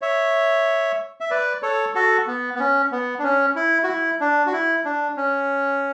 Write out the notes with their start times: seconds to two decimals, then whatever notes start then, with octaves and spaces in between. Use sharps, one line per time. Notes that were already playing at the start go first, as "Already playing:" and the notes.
0.01 C#5 E5
1.20 E5
1.31 B4 D5
1.62 A4 C#5
1.95 F#4 A4
2.27 B3
2.55 B3
2.59 C#4
2.92 B3
3.19 D4
3.23 C#4
3.56 E4
3.84 F#4
3.88 E4
4.20 D4
4.46 F#4
4.53 E4
4.85 D4
5.17 C#4